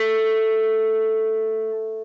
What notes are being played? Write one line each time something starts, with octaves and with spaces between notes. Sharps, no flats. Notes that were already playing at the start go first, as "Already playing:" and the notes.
Already playing: A3